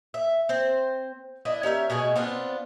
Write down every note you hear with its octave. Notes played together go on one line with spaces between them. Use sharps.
E5
C4 C5
D4 E4 D#5
C#4 G4 A#4 E5
B2 A3 G#4 G#5
B3 C4 D4 F4